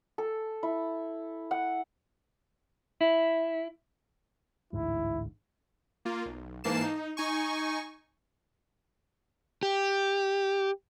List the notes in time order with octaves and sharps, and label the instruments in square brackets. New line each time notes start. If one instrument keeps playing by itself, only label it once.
[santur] A4
E4
F#5
[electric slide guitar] E4
[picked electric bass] A1 D2 G#2 [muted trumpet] E4
[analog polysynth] A#3 F4
B1
G#2 E3 A#3 A5 C7 E7
D#4
D#4 G#5 C#6
[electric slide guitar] G4